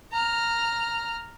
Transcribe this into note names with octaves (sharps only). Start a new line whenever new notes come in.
A#5 F6